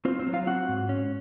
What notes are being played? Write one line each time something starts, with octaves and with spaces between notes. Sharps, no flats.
C4 F4 C5
C4 C5
F#3
F4 F5
C4 F#4 F#5
G#2
C#4